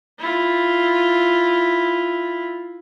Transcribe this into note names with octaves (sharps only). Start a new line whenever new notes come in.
E4 F4